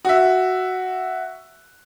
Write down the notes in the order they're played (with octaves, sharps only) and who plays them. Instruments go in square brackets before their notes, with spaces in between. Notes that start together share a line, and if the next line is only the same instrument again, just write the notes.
[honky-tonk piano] F#4 E5